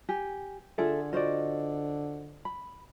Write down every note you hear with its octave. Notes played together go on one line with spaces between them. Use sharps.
G4 G#5
D3 F4 G#4 A4 E5
F4 F#4 C5 D5 D#5
B5